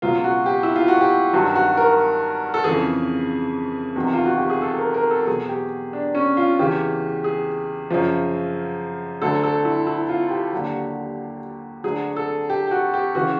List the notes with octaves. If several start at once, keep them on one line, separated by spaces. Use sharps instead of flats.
C#2 B2 F#3 F4
F#4
G4
E4
F4
F#4
G4
G2 D#3 F#3 F#4
F#4
A#4
A4
F2 C#3 E3 G#4
E2 C3 D#3 F#3
F4
F#4
G4
G#4
A4
A#4
A#4
A4
E2 B2 F#3 G#4
G4
D4
C#4
F4
E2 C#3 E3 G4
G#4
F#2 C#3 F3
D2 D3 F#3 A4
A4
E4
E4
F4
G4
D#2 D3 F#3
D2 D3 F#3 G#4
A4
G4
G4
F#4
G4
C#3 E3 F#4